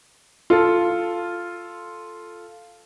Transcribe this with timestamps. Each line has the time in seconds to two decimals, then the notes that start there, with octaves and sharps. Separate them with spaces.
0.50 F4 A4